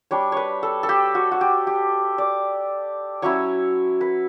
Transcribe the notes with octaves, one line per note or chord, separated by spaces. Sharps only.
G3 D4 C#5
B4 C#5
A4
A4
G4
F#4
F#4
G4
G4
D5
F#3 C#4 E4 C#5
B4